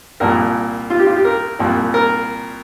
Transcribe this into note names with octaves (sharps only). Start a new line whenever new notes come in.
C2 A#2 F3 A#4
F4
G4
F4
G4
A#4
C2 A#2 F3
A#4